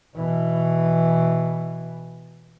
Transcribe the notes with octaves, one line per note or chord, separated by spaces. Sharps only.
B2 E3